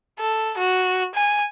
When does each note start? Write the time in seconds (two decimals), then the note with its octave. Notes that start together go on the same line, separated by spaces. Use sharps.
0.20 A4
0.58 F#4
1.15 G#5